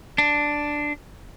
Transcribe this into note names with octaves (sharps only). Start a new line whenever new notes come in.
D4